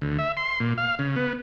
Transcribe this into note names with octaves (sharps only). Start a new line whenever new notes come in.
D2
E5
C6
A#2
F5
C#3
B3